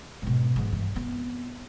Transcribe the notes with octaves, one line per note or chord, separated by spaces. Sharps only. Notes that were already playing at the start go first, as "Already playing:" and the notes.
G#2 B2
G#2 E3
G2 E3
B3 C4